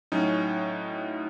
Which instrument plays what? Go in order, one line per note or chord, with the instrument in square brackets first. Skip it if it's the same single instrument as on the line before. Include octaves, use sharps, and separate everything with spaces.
[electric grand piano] A2 F#3 C#4 D#4